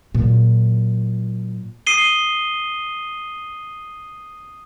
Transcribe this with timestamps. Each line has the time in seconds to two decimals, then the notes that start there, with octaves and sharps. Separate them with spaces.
0.15 A#2 F#3
1.87 D#6 C7 D#7 G7